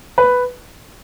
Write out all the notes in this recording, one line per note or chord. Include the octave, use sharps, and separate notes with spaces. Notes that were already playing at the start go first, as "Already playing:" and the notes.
B4